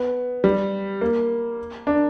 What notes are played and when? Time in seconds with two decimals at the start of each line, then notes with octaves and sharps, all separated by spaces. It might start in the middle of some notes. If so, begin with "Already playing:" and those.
Already playing: B3
0.44 G3
1.01 A#3
1.87 D4